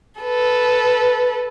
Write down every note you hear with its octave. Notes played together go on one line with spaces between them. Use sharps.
A4 B4